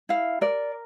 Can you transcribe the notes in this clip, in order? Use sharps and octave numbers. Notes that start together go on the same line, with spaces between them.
E4 F5
A#4 D5